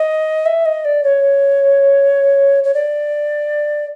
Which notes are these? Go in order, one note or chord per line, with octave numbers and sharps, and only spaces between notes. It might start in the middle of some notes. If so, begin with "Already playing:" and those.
Already playing: D#5
E5
D#5
D5
C#5
C#5
D5